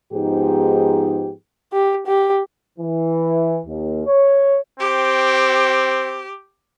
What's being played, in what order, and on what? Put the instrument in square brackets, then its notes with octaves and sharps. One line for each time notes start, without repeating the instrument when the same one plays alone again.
[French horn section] G#2 F3 B3 D#4 G4 G#4
[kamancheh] G4
G4
[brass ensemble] E3
D#2
C#5
[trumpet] C4 [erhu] G4